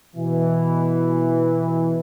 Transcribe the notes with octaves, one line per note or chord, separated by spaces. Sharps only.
B2 E3